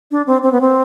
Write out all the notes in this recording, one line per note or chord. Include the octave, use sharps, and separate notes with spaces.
D4
C4
C4
B3
C4